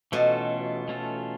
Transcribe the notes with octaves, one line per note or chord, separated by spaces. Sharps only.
B2 E3 A3 C#4 F4 A4
E3 A3 C#4 F4 A4